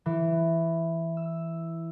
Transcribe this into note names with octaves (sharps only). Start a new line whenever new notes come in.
E3
E6